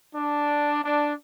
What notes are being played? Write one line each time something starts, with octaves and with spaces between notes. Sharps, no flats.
D4
D4